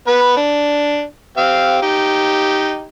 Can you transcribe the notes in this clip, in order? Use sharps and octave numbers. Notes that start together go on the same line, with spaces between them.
B3 B4
D4
C4 G4 F5
D#4 G4